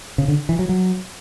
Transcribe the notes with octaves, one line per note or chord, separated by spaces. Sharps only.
C#3
D3
E3
F#3
F#3